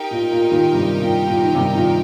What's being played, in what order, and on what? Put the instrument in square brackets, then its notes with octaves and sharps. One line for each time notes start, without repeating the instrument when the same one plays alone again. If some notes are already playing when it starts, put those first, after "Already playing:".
Already playing: [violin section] D#4 G4 A#4 G5
[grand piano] A#2
A#2
A#2 D#3
G2 C3
A#2
A#2
D#3
G2 C3
A#2 D#3